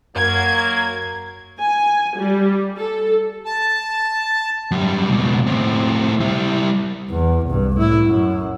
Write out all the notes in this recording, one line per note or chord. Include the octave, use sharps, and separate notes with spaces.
F#2 F#3 A#3 G#6
G#5
G3
A4
A5
F#2 G3
C#2 B2
A2 C4
G3 E4
E2
C2 G2
A2 E4
F#2